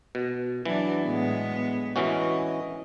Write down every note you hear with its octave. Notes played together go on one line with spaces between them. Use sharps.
B2
E3 F#3 D4
A2 G#3 B3
E3 C#4 F#4 D#5